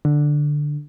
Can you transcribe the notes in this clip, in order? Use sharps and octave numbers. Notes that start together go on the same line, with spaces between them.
D3